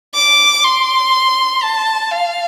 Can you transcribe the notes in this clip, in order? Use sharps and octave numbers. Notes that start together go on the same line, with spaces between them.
D6
C6
A5
F5